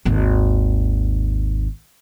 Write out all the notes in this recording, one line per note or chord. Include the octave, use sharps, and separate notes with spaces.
G#1 D#2